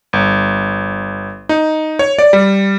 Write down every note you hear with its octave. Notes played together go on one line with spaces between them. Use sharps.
G1
D#4
C#5
D5
G3